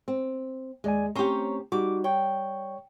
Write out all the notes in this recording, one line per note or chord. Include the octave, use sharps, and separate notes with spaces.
C4
D#2 G#3 D5 G#5
A3 C4 C#4 G4 C5 C#5 A#5
G3 D#4 F#4 D6
C#5 G5 C#6